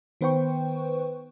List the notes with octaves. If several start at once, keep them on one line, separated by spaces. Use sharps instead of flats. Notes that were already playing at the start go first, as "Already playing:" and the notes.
D#3 B3 B4 C5 G5 C#6